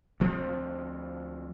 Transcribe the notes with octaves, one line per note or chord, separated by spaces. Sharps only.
D2 F3 C4